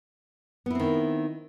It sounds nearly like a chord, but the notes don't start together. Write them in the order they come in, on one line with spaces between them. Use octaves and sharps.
B3 E4 C4 D#3